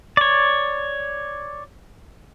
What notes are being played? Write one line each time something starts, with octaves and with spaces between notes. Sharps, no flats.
C#5 D5